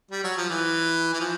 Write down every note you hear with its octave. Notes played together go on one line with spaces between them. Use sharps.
G3
F#3
F3
E3
E3
F3